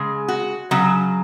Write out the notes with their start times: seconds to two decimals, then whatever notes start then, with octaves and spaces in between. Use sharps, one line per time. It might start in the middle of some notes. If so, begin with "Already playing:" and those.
Already playing: C#3 G#3
0.28 F#4
0.71 C#3 F#3